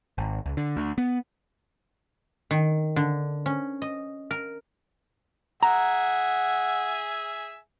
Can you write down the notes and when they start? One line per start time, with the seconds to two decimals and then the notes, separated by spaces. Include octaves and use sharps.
0.18 G#1
0.46 C#2
0.57 D3
0.77 D2
0.98 B3
2.51 D#3
2.96 D3
3.46 C#4
3.82 D#5
4.31 A#4
5.63 G#4 E5 F#5 G#5 A#5